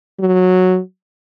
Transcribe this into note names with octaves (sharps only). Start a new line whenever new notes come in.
F#3